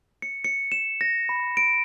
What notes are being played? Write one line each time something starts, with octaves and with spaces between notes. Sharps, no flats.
C#7
C#7
E7
A#6
B5
D7